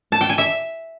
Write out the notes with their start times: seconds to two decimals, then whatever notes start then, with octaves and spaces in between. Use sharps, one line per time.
0.12 A5
0.21 G5
0.29 G#5
0.38 E5